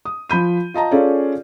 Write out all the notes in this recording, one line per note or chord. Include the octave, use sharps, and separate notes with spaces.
D#6
F3 B5 G6 D#7
F4 D#5 A5 A#5
C#4 F4 G#4 A4 C#5 D5